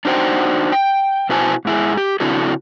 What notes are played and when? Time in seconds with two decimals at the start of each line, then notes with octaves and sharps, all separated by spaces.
0.05 D4 D#4 F#4 C5 G5
0.72 G5
1.29 B2 E4 F#4 C5 G#5 A5
1.65 G#2 E4 G#4
1.97 G4
2.20 C#3 C4 D4 E4 F#4 A4